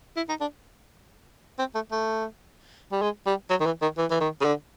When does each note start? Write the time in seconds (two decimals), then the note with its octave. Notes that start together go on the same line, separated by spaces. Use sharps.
0.17 E4
0.29 D#4
0.41 D4
1.59 C4
1.75 A3
1.92 A3
2.92 G3
3.02 G#3
3.26 G3
3.50 F#3
3.61 D#3
3.66 E3
3.82 D#3
3.98 E3
4.11 E3
4.21 D#3
4.41 C#3
4.45 D3